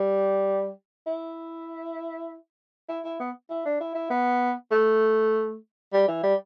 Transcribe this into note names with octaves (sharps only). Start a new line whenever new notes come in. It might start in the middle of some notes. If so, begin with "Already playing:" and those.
Already playing: G3
E4
E4
E4
B3
E4
D4
E4
E4
B3
A3
G3
E3
G3